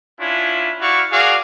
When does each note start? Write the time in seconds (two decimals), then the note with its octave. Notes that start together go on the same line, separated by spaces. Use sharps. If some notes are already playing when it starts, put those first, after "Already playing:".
0.19 C#4 D4 E4 F4
0.81 E4 F#4 D5 F5 C#6
1.12 F#4 G#4 A#4 D5 F5